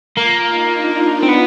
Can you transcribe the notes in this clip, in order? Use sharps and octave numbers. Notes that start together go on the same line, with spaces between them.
A#3 F4
D#4
D4
D#4
C4
B3